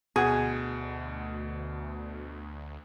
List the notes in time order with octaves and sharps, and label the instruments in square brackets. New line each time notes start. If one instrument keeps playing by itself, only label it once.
[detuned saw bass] D2 [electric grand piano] B2 F#5 [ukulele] G#4